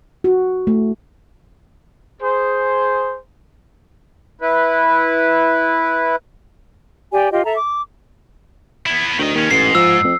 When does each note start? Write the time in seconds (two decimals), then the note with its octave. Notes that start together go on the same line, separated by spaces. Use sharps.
0.24 F#4
0.67 A3
2.22 G#4 C5
4.41 E4 B4
7.12 G4 D5 G#5
7.32 F4 G4 D#5
7.45 A4 E5 A#5
7.56 D6
8.86 B3 E4
9.18 D2 D#3 D#5
9.35 D#2 D#3 C#4
9.51 A1 G#2 C7
9.75 F3 E6
10.04 F2